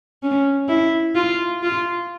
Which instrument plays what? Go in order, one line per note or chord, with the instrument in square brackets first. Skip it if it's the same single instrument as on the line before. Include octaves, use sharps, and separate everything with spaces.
[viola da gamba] C#4
E4
F4
F4